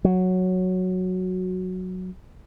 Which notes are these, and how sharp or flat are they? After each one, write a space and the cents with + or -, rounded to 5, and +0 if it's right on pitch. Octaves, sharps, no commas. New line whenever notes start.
F#3 -5